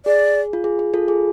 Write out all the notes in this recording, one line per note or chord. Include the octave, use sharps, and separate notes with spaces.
G#4 D5
F4
G#4
G#4
F4 A4
G#4